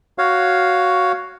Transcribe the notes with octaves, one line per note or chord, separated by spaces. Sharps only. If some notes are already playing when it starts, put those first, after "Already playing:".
F#4 C#5 F5